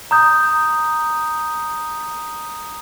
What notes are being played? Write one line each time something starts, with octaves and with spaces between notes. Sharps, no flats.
A#5 D#6 G6